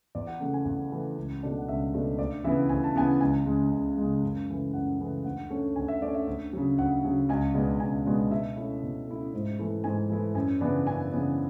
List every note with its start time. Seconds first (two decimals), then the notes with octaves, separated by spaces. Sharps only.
0.15 E2 D5
0.27 F#5
0.40 C#3 E3 A3 F#5
0.54 G#5
0.66 E2 F#5
0.91 C#3 E3 A3
1.17 C#2
1.43 B2 A3 D4
1.58 F#5
1.67 C#2 E5
1.94 B2 A3 D4
2.19 D2 D5
2.44 C#3 E3 B3 E4 E5
2.69 D2 G#5
2.84 A5
2.96 C#3 E3 B3 E4 G#5
3.21 C#2 G#5
3.46 C#3 G#3
3.71 C#2
3.98 C#3 G#3
4.23 F#2
4.48 C#3 E3 A3
4.73 F#2 F#5
4.99 C#3 E3 A3
5.24 D2 F#5
5.50 D3 A3 C#4
5.76 D2 G#5
5.88 E5
6.01 D3 A3 C#4 D5
6.14 E5
6.27 D2
6.53 C#3 F#3
6.78 D2 F#5
7.04 C#3 F#3
7.29 C#2 G#5
7.54 B2 G#3 B3 D4
7.80 C#2 G#5
8.05 B2 G#3 B3 D4
8.31 B2 E5
8.56 A3 C#4 E4
8.83 B2
9.07 A3 C#4 E4
9.33 G#2
9.58 E3 A3 E4
9.84 G#2 G#5
10.10 E3 A3 E4
10.35 F#2 G#5
10.61 C#3 E3 B3 D4
10.86 F#2 G#5
11.12 C#3 E3 B3 D4